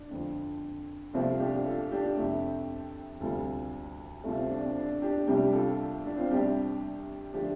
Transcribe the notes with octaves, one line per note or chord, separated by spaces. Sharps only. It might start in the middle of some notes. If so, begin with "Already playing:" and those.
Already playing: D4
F2 D3 F3
C2 C3 F3 A3 C4 F4
F4
D4 G4
F4 A4
D4 G4
F2 C3 A3
D2 C3 G3 F4 A4
C2 C3 A3 F4 A4
C4 F4
D4
C4
D4
D4 G4
C2 C3 G3 D4 G4
F4 A4
D4
C4 F4
C2 C3 G3 D4 G4
D3 F3 A3 D4 G4